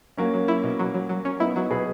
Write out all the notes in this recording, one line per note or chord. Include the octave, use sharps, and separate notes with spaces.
F#3 A#3 C#4
F#3
E4
B2
F#3
F#3
F#3
C#4
B3 D#4 E4
F#3
B2 G#4 B4